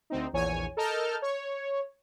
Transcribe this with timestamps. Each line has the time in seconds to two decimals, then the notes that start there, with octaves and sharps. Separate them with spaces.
0.10 D2 C4 D#4
0.33 A#1 E2 C#5 G#5
0.77 A4 A#4 D#5 A5 F6 G6
1.22 C#5